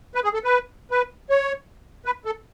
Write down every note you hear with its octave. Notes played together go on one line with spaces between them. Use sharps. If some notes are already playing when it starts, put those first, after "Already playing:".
B4
G#4
A4
B4
B4
C#5
B4
A4